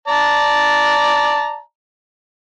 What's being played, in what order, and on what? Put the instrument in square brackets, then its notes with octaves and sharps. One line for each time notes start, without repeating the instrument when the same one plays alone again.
[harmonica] D5 A5 A#5